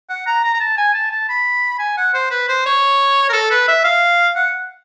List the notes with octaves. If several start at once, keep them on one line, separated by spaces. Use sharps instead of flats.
F#5
A#5
A#5
A#5
A5
G#5
A5
A5
B5
G#5
F#5
C5
B4
C5
C#5
A#4
A4
B4
E5
F5
F#5